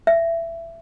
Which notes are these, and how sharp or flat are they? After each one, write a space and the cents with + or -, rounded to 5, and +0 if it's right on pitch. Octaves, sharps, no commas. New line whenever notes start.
E5 +20